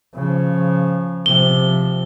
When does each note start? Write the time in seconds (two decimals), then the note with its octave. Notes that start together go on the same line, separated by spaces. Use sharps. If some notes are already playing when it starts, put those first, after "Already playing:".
0.15 C#3 F3
1.26 C3 F3 G7